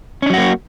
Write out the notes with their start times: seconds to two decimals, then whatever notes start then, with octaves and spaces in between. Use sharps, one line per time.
0.22 C#4
0.26 D4
0.30 F#3
0.34 F#4
0.37 A#3